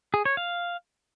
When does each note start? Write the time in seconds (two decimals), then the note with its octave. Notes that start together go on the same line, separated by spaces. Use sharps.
0.14 G#4
0.25 C#5
0.37 F5